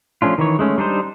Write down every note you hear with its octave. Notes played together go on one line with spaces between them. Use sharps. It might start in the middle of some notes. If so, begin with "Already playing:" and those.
F3 A3 C#4 D4 F4
D#3 E3 C#5
G#3 A3 C#4
G3 D4 D#4 C5